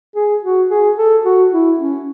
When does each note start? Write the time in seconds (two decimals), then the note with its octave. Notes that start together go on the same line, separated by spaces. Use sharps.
0.16 G#4
0.43 F#4
0.70 G#4
0.97 A4
1.25 F#4
1.52 E4
1.79 C#4